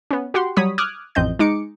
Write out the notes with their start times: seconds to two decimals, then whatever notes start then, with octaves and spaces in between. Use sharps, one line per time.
0.11 B3 C#4
0.34 F#4 G4 F#5 C6
0.56 F#3 G3 C#5 B5 D#6 B6
0.78 D6 D#6 F6 F#6 G#6
1.15 A1 F2 C4 D#5 G6
1.39 G#3 D#4 D6 C#7 D7